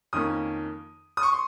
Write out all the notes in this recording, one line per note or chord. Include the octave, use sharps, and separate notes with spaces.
F2 D#3 A#3 C#4 D#6
D#6
C#6
C6